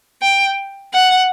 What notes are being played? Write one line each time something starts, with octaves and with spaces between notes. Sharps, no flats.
G5
F#5